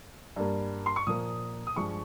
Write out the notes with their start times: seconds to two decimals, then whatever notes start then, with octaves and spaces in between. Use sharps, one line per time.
0.36 G2 G3 A#3
0.86 C6
0.96 C#6
1.07 A#2 F3 A#3 D#6
1.67 D#6
1.76 G2 F3 G#3 C#6